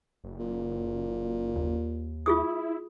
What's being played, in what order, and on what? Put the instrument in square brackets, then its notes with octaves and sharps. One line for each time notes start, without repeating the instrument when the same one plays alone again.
[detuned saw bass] F#1
[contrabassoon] A#2
[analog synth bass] D#2
[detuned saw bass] E4 [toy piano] F4 G#4 D#6